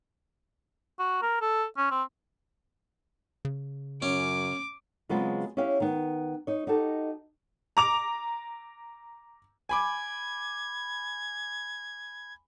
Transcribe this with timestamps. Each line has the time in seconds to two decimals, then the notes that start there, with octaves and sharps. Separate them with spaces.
0.99 F#4
1.22 A#4
1.41 A4
1.77 C#4
1.91 C4
3.45 C#3
4.02 F#2 C#4 D6
5.09 C#3 F#3 G#3 B3 C4 F4
5.57 C#4 E4 G4 C#5 F5
5.80 D#3 B3
6.47 D#4 C#5
6.67 D#4 F#4 G4 A4
7.77 A#5 D6 F7
9.69 G#5 B5 D6 G#6